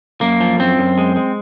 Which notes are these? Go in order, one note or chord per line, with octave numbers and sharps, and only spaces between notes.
F#2 A#3
F3
F#2 C4
F#2
G#3
G#3